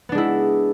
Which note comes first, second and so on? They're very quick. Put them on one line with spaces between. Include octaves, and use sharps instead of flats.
B3 D4 G#3 E4